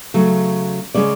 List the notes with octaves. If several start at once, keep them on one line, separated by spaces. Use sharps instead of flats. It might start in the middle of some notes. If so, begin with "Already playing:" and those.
C#3 F#3 A3
C#3 G#3 C#4 D5